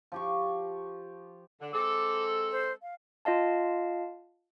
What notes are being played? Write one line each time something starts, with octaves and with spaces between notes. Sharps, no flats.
F3 G4 C#6
D3
G#3 C4 A4 D6
C5
F5
F4 D#5 F5 A5